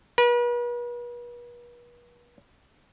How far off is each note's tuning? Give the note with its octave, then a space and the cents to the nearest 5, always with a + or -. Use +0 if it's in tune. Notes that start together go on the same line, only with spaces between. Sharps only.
B4 -40